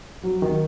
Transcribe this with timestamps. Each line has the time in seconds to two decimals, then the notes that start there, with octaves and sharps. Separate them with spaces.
0.23 F#3
0.42 D#3